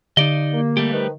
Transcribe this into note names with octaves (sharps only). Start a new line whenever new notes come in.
D3 D#4 D5 D#5
A#3
G3 A3 G4
D#3 F3 B4